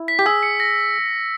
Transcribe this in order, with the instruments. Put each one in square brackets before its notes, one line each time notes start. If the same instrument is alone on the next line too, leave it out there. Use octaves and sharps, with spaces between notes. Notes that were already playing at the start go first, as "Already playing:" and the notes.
Already playing: [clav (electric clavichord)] E4
[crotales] B6
[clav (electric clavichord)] G4
[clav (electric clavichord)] G#4 [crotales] E6
[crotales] C#7
A#6